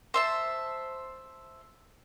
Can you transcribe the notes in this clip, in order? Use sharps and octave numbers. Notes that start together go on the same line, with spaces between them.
C5 E5 A5